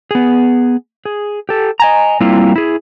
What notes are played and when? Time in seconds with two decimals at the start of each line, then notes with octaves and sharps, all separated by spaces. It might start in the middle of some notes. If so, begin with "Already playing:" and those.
0.11 B3 G#4
1.05 G#4
1.49 G4 A4
1.80 D#5 G#5 A#5
2.20 G3 A#3 C4 E4 F4
2.56 E4 G#4